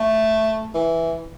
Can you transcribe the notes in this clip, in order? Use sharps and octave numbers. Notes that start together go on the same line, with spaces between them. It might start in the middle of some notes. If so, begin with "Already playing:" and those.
Already playing: A3
E3